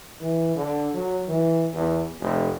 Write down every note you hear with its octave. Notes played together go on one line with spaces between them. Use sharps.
E3
D3
F#3
E3
E2
F1